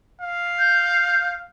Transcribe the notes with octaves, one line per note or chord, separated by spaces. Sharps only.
F5
G6